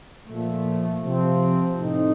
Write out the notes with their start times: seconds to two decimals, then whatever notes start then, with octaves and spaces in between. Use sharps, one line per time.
0.26 A#2 F3 A3
1.03 C3 F3 C4
1.80 A2 A3 C4 D#4